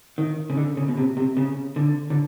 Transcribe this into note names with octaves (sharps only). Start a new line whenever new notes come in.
D#3
C#3
D3
C#3
B2
C3
C3
C#3
D3
D3